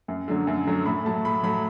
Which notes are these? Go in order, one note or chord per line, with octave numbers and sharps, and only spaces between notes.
F#2
D3 F#3 A3
F#2
D3 F#3 A3
A2 B5
F#3 A3 A5
A2 B5
F#3 A3 B5